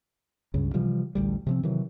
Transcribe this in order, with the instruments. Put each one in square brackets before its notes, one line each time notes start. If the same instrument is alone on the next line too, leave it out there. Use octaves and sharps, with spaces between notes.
[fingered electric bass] C#2 G2 C#3
C3 E3 F3 G3
A1 D2 G3
C3 F3 C4
C3 D#3 E3 F#3